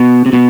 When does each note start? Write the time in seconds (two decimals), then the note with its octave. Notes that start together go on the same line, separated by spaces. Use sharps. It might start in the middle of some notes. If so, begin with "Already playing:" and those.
Already playing: B2
0.26 C3
0.33 B2